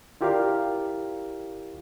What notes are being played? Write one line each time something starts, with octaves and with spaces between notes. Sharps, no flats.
E4 F4 G4 A#4 D5 F5